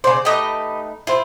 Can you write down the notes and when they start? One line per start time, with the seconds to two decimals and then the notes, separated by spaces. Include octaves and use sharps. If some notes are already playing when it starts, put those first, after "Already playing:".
0.04 C#3 C5 D5
0.25 A3 D#4 G4 B4 D#5
1.07 C4 E4 F4